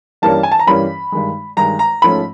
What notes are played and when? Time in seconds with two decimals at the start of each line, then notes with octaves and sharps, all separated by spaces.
0.22 G2 E3 G3 A#3 C#4 A5
0.43 G#5
0.52 A5
0.59 A#5
0.67 G2 E3 G3 A#3 C#4 B5
1.12 G2 D#3 G#3
1.57 G2 D#3 G#3 A#5
1.79 A#5
2.02 G#2 F3 A3 C#4 B5